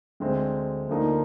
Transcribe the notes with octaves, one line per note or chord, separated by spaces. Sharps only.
D2 D3 G#3 C4
D2 D3 F3 A#3 D#4